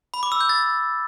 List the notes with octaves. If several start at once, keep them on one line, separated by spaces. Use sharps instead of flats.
B5
D6
E6
G6
A6